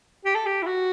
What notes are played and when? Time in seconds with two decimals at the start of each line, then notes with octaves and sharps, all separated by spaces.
0.25 G4
0.35 A4
0.46 G4
0.62 E4
0.66 F#4